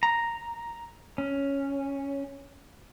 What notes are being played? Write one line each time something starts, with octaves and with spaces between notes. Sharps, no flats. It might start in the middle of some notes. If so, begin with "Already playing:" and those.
A#5
C#4